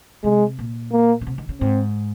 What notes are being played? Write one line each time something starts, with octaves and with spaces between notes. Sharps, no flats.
C3 G#3
A#2
A#3
C#3
C3
D#3
C#3
G#2 C4